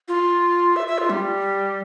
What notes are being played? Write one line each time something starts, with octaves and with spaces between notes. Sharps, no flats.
F4
E5
E5
F4
G3